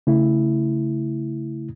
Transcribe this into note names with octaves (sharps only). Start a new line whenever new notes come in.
C#3 A3 E4